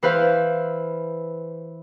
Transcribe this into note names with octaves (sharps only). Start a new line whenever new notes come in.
E3 B4 C5 F5